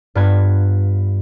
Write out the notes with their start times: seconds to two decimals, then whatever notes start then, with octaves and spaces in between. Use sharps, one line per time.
0.15 G2 B3 F4 B4 G#6